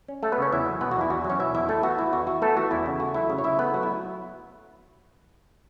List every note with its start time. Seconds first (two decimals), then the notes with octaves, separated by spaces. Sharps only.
0.08 C#4
0.23 A3 A4
0.32 B3 B4
0.38 C#3 C#4 C#5
0.52 E2 E4 E5
0.66 F#3
0.81 B2 B3 B4
0.91 F#4
0.96 E2
1.01 E4
1.10 E2 F#4
1.25 F#3
1.30 C#4 C#5
1.39 B2 E4 E5
1.54 E2 E4 E5
1.69 A3 E4 A4
1.83 B3 F#4
1.98 E3 E4
2.12 E2 F#4
2.27 E4 F#4
2.42 A3 B3 A4
2.57 E3 F#4
2.71 E2 E4
2.86 C#3
3.00 A3 F#4
3.14 F#3 E4
3.30 C#3
3.38 C#5
3.44 C#3 E4 E5
3.59 A3 B3 B4
3.74 F#3 F#4
3.83 E4